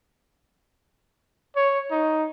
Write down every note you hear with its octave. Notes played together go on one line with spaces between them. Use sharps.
C#5
D#4